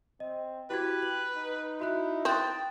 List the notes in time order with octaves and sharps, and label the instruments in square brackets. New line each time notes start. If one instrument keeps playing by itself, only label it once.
[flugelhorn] C4 [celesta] D#5
[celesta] E4 F#4 G#6 [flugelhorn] G4 [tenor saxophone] B4
[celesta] F#7
[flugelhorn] D#4
[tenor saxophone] E4 [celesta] F#4 B5 F#6
[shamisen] C4 [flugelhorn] G5 [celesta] D#6 F#6 A6